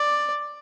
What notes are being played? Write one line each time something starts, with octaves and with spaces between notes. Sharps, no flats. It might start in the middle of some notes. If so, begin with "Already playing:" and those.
Already playing: D5